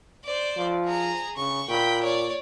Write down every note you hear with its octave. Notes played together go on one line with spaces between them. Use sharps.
C5 D5
F3
G#4 A#5
C#3 C#6
A#2 G5 B5
C#5 D5